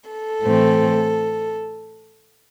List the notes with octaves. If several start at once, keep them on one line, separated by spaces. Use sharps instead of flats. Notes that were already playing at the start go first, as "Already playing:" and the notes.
A4
A2 E3 A3 C4